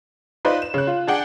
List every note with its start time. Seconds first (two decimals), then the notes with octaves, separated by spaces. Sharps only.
0.45 D#4 F4 B4 C5 D5 D#5
0.62 E7
0.74 C#3 F#6
0.87 F4
1.07 D4 G#4 D5 F#5 G5